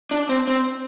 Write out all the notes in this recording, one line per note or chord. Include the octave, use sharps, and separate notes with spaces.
D4
C4
C4